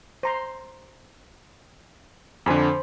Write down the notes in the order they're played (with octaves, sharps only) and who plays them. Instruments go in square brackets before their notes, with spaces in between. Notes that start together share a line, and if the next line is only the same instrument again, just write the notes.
[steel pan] C5 A#5 C6
[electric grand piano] F2 D3 [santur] C5 B5 [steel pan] G#5 D6